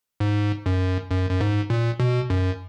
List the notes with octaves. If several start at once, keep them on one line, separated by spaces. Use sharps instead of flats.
G#2
F#2
F#2
F#2
G#2
A#2
B2
F#2